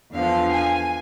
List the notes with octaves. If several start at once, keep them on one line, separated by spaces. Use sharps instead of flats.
E2 D3 F3 F5
G#5